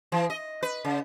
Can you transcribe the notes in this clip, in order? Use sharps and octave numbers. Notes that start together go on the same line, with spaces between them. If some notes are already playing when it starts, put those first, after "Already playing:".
E3
D#5
B4
C#3